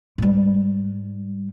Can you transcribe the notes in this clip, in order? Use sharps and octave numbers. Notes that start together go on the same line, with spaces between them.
G#2 G3